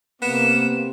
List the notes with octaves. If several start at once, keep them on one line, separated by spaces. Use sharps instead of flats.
C3 A#3 B3 E7